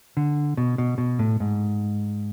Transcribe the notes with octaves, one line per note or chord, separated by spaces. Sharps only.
D3
B2
B2
B2
A2
G#2